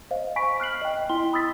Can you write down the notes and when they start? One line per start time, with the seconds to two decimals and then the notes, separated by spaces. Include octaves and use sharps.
0.11 C5 D#5 F5
0.36 G#5 B5 C#6 B6 D7
0.60 F6 F#6 C7 F#7
0.82 D#5 G5
1.09 E4 G5 C6 G7
1.33 B5 D#6 E6 A6 B6